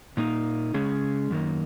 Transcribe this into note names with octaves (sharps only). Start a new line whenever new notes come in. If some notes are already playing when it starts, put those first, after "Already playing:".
A#2 A#3 D#4
C#3 G#3 C#4 G#4
F#2 D#3 A#3